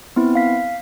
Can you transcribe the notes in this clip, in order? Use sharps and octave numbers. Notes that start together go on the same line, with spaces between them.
B3 C4 E4
F5 B6